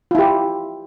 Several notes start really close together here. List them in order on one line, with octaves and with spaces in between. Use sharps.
F4 E4 G4